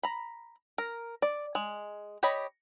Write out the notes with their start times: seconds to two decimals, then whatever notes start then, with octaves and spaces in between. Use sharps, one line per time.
0.03 A#5 B5
0.78 A#4
1.22 D5
1.55 G#3
2.23 G4 C#5 D#5 B5